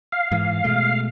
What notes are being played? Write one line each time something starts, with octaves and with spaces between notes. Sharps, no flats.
F5
G#2 E3
B2 G#3 A3